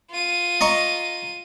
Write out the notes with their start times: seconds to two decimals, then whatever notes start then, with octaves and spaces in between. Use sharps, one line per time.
0.10 F4 D#7
0.61 D#5 A#5 C#6